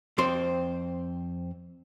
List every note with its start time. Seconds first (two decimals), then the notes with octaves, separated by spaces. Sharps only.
0.18 F2 C4 C5 C6